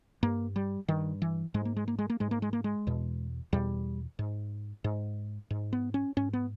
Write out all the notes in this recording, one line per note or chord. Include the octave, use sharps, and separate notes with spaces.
G2 A#3
G3
G2 D#3
E3
G#2 G#3
A#3
G#3
A#3
G#3
A#3
G#2 G#3
A#3
G#3
A#3
G#3
E2 B2
E2 B2 G3
G#2
G#2
G#2
B3
C#4
G#2 C#4
B3